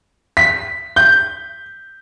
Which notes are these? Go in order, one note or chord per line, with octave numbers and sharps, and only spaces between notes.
B6
G6